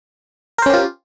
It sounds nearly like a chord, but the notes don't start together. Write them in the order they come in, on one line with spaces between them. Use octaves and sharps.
A#4 C5 C#4 G4 F4